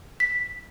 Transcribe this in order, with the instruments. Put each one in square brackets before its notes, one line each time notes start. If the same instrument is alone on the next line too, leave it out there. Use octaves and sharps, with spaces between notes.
[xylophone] B6